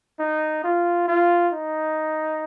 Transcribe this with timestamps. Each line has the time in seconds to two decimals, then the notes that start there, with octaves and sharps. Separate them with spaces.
0.20 D#4
0.64 F4
1.08 F4
1.53 D#4